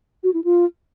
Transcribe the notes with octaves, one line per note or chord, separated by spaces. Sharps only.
F#4
E4
F4